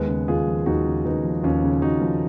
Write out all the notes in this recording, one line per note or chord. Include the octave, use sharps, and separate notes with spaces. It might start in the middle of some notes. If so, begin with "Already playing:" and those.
Already playing: D#2 G#3 B3
C#3
D#2 F4 G#4
F3
D#2 D#4 F#4
C#3
D#2 B3 D#4
F3
D#2 C#4 F4
C#3
D#2 D#4 F#4
F3